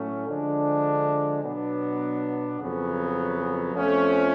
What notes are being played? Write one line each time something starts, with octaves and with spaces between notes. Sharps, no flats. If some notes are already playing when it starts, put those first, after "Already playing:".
Already playing: A2 F#3 A3 C#4
D3 F3 G#3 D4
B2 F#3 B3 D4
F2 C#3 F#3 B3
F2 F3 A3 C#4